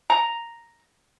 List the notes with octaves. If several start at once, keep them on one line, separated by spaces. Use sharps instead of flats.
A#5